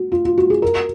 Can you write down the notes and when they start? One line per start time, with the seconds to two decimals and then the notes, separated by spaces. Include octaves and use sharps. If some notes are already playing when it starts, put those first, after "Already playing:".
Already playing: F#4
0.12 F4
0.25 F4
0.38 F#4
0.50 G#4
0.62 A#4